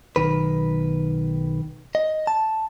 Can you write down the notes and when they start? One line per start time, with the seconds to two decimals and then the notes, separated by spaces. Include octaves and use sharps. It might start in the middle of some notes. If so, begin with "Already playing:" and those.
0.16 B1 D#3 B4
1.95 D#5
2.27 A5